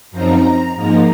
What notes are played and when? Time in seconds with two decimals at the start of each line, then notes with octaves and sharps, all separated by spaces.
0.11 F#2 F3 C4 D#4 A#5
0.75 G#2 F3 A#3 D#4 A#5